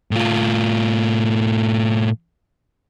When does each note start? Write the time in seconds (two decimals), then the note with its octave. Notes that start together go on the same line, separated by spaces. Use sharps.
0.11 A2 F4